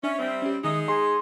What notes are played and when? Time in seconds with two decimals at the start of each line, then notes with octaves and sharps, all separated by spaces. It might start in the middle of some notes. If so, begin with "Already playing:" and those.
0.03 C#4 D4 E5
0.19 G3 C4
0.42 C#4 G4
0.64 D#3 G#3 D#4 E5 D#6
0.88 G#4 D#5 A#5 C6